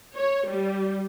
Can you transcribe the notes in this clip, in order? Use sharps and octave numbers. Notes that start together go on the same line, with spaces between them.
C#5
G3